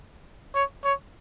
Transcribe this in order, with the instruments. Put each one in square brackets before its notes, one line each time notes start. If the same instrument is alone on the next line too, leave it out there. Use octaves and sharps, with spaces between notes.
[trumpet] C#5
C#5